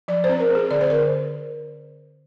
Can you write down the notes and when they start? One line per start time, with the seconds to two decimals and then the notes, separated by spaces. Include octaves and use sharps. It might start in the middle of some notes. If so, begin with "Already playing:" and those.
0.08 F3 D5
0.24 C5
0.29 C4
0.40 A#4
0.50 C4 G#4
0.71 D3 D5
0.81 C5
0.90 D3 A#4